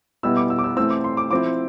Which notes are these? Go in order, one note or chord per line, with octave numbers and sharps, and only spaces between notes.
B2 G3 B3 E4 E6
D6
E6
D6
E6
E3 A3 C4 E6
D6
C6
D6
F3 C4 E4 D6